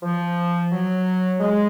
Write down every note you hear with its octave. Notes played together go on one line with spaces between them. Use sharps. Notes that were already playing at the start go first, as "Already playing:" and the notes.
F3
F#3
G#3